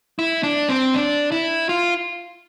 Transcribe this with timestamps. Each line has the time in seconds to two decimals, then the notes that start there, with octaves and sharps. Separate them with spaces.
0.19 E4
0.43 D4
0.69 C4
0.94 D4
1.32 E4
1.69 F4